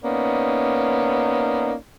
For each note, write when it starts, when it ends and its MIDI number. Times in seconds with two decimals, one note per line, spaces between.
0.03 1.74 58
0.03 1.74 59
0.03 1.74 61
0.03 1.74 63
0.03 1.74 74